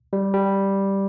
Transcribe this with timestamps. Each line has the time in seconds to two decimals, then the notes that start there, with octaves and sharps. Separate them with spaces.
0.13 G3
0.34 G3